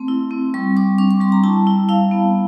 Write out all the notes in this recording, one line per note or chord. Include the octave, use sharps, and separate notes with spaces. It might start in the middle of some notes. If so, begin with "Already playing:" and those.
Already playing: A3 C4
E4
C4
G3 C#6
G3 D6
D4 C#6
C#6
G3 C6
A#5
E4 A5
E4
E4 F5
B3